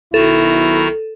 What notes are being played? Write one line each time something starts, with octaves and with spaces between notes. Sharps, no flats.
B1 D#3 E4 F#4 A4 A#5